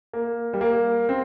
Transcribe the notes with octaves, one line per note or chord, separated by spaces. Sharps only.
A#3
G3
A#3
C4